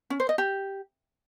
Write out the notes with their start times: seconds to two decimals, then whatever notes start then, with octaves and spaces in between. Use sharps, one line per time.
0.10 C#4
0.20 C5
0.29 D#5
0.38 G4